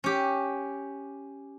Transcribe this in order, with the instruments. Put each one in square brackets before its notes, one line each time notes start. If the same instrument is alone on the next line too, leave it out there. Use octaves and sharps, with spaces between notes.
[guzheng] C#4 G4